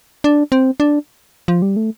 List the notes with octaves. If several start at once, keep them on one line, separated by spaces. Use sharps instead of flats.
D4
C4
D4
F3
G3
A3